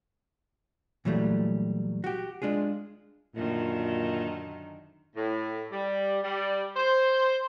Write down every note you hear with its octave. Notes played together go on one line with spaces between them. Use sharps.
A#2 E3 F#3 G3 A3
F#4 G4
G#3 D4 F4 G#4
F#2 A#2 D3 D#3
A2
G3
G3
C5